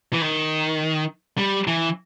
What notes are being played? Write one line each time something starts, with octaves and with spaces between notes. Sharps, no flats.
E3
D#3
G3
E3